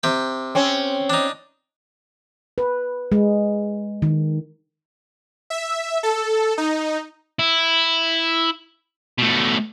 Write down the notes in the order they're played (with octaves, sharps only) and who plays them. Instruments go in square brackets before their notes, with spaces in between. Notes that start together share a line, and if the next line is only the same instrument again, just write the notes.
[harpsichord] C3 G5
[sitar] C4 C#4
[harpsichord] D4 D#4
[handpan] B4
G#3
D#3
[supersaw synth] E5
A4
D#4
[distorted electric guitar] E4
B2 A3